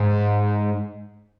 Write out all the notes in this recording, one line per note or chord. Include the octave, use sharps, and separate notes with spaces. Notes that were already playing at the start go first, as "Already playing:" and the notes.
Already playing: G#2